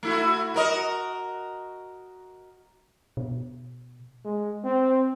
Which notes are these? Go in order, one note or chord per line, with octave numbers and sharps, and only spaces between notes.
A3 E4 F#4
F#4 A#4 D#5
B2
G#3
C4